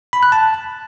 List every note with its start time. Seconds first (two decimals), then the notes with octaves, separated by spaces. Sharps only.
0.13 B5
0.23 F#6
0.32 A5